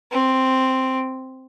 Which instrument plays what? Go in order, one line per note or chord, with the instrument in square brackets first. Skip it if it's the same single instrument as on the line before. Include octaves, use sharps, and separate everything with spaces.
[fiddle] C4